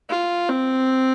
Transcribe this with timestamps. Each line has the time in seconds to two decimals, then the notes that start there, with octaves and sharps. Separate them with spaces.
0.10 F4
0.49 C4